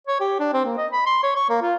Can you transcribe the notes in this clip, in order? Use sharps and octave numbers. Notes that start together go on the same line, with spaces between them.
C#5
G4
D4
C4
A#3
D#5
B5
C6
C#5
C#6
A#3
F4